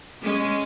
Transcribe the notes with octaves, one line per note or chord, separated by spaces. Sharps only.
G#3 C#4